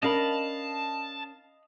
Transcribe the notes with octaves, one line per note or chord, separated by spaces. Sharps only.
C#4 D4 A#4 D#5 F5 A5 B5